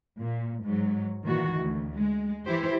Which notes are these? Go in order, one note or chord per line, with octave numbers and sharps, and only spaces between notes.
A#2
G#2 F#3
A#2 D#3 E3 F#4
D2
G#3
E3 E4 G4 C5